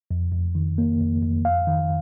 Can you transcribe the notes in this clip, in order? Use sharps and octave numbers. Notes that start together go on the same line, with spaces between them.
F2
F2
D#3
A#3
F2
F2
F5
D#3